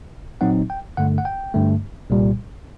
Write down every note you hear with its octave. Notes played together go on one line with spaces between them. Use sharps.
A#2 F#3 C4 D#4 F#5
G5
G2 D3 A3 F#5
F#5
G5
G2 D3 A3
C2 A#2 G3